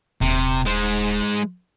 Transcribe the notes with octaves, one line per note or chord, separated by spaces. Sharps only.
D#1 C3
G#3 C5